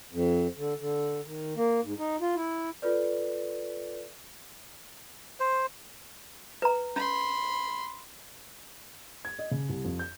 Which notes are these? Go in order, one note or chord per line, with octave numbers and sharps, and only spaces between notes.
F2
D3
D3
D#3
A#3
G#2
D#4
F4
E4
F4 A4 B4 D5
C5
B4 A#5
C#4 B5 C6
G#6
D#5
C#3
C2
F2
G6